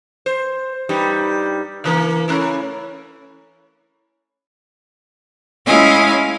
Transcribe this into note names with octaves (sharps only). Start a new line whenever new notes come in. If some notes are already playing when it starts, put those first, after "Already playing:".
C5
G2 G3 D#4
C#3 E3 A#3
A3 C#4 E4
G#3 C#4 E4 D#5 F5 G#5